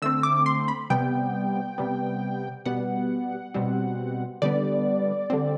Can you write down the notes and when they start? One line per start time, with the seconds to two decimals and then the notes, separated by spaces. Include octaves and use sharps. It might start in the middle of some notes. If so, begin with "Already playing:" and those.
0.02 D3 A3 C4 E6
0.23 D6
0.46 C6
0.68 B5
0.90 C3 G3 B3 G5
1.78 C3 G3 B3
2.65 B2 G3 B3 F#5
3.54 B2 G3 C4
4.42 D3 G3 B3 D5
5.30 D3 G3 C4